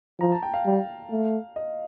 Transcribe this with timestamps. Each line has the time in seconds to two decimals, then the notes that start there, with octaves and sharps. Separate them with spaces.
0.20 F3 A#5
0.32 A5
0.43 G5
0.54 F5
0.66 G3
1.10 A3
1.56 D#5